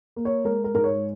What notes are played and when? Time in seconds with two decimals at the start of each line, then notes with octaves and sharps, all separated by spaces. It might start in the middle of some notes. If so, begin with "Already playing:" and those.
0.16 A#3
0.25 C#5
0.45 G#3 A#4
0.64 A#4
0.74 G#2 A#4
0.84 C#5